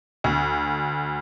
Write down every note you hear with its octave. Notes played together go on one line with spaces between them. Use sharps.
D2